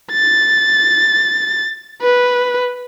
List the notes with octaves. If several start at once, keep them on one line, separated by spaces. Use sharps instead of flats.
A6
B4